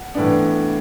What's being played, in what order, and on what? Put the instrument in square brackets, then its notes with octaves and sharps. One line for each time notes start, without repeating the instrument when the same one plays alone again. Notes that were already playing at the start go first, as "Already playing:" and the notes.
Already playing: [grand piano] F#5
A2 E3 B3 D4